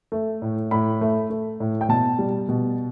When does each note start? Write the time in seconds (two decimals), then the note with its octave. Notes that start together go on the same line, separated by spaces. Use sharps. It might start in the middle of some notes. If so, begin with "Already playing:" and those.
0.12 A3
0.42 A2
0.71 A2 B5
1.01 A3
1.30 A3
1.60 A2
1.81 G5
1.89 B2 A5
2.19 G3
2.49 B2